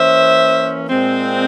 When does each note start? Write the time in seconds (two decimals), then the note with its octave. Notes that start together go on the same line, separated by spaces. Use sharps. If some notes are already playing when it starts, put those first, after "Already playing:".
Already playing: E3 A#3 C#4 C5 E5
0.90 A#2 G#3 C4